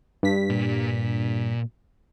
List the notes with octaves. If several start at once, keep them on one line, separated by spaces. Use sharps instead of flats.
G2 B6
A#2